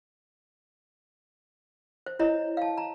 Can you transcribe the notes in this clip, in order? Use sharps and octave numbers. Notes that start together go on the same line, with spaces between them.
C5
E4 C#5 D#5 A#5
F5 A5
A#5